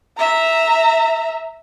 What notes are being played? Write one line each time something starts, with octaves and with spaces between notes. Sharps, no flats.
E5 A#5